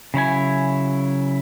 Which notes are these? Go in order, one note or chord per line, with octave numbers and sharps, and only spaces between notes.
C#3 F#3 E4 G#5